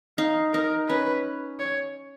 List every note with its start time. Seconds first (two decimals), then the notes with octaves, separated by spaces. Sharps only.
0.18 D#4 F5
0.53 D#4 A#4
0.88 C#4 B4
1.60 C#5